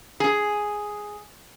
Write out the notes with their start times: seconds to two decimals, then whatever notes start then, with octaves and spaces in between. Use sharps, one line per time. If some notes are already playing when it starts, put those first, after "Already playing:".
0.20 G#4